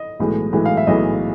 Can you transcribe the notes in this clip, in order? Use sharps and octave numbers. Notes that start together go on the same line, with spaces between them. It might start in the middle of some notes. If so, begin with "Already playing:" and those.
Already playing: D#5
B1 A2 E3 G#3
B1 A2 E3 G#3
F5
E5
B1 A2 E3 G#3 D#5